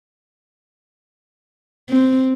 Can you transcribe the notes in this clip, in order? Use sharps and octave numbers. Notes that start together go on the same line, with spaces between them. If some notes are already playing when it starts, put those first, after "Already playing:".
C4